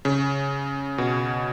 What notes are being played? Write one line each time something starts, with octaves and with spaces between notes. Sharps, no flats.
C#3
B2